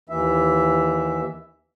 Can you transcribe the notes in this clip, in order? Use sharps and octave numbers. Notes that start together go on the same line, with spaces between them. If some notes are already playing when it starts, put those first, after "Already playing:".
D#2 E3 E5